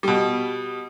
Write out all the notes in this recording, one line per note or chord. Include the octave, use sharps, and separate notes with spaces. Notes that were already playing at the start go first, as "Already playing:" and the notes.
B2 G3